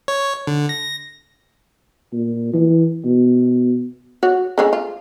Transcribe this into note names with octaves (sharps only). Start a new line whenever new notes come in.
C#5
D3
A#6
A#2
E3
B2
F#4 C#5
D3 G#3 C#4
F4